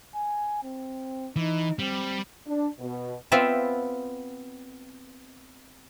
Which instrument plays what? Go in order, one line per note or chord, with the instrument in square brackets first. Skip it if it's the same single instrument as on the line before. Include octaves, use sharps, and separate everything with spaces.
[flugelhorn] G#5
C4
[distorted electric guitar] E3 [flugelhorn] D#4
[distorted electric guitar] G3 [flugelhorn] C4
[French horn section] D4
B2
[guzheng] B3 C4 F4 E5